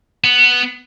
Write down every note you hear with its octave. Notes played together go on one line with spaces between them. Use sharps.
B3